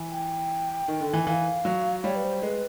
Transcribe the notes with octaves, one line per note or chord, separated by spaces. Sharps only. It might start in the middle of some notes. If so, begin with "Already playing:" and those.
Already playing: E3
G5
D#3
D3
E3
E3 F5
F#3
G3 C#5
B4
C5
G#3 B4